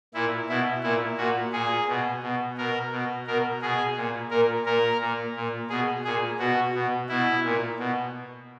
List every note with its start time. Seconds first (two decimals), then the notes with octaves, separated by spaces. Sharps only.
0.14 A#2 E4
0.49 B2 E4
0.83 A#2 E4
1.18 A#2 F#4
1.53 A#2 G#4
1.88 B2
2.22 B2
2.57 B2 A#4
2.92 B2
3.27 B2 A#4
3.62 B2 G#4
3.97 A#2
4.31 A#2 A#4
4.66 A#2 A#4
5.01 A#2
5.36 A#2
5.70 B2 G#4
6.04 A#2 G#4
6.39 B2 F#4
6.75 B2
7.09 B2 E4
7.44 A#2
7.79 B2